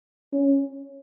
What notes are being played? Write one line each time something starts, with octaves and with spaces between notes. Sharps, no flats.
C#4